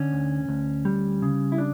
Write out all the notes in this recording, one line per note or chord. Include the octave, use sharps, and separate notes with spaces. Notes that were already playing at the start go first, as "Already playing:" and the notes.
Already playing: D3 C#4
D2
D2
G3
C#3
E4
D4